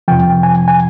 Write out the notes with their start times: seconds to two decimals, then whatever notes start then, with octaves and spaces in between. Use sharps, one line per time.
0.08 F2 C3 F3 G5
0.43 G#5
0.68 G#5